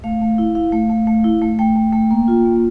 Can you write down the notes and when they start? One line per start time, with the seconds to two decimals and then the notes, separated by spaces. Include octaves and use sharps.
0.04 A3 F5
0.21 A3
0.38 E4
0.55 E4 F5
0.72 A3
0.90 A3
1.07 A3
1.24 E4
1.42 A3
1.59 A3 G5
1.76 A3
1.93 A3
2.11 A#3
2.28 F4
2.45 A#3